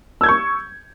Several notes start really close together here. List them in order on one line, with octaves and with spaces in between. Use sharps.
E6 G#6 G6 C#6